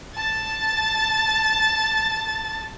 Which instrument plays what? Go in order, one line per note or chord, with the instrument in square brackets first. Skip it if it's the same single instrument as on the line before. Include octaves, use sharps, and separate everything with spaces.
[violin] A5 A6